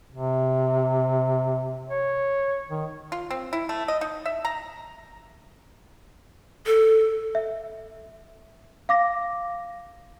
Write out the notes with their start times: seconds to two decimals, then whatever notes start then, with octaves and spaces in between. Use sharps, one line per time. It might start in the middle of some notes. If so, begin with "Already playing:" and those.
0.12 C3
1.89 C#5
2.69 D#3
3.12 F4
3.31 C4
3.53 E4
3.69 A3
3.88 D#5
4.01 D#4
4.26 E5
4.45 A#5
6.66 A4
7.35 E5
8.89 F5 D6 A#6